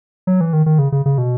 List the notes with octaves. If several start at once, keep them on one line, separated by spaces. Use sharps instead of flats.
F#3
E3
D#3
D#3
C#3
C#3
C#3
B2